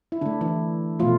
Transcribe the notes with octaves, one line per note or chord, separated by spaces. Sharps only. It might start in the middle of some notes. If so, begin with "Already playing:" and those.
E4
D3 D4
A3
E3 E4
B2 F3 A3 F4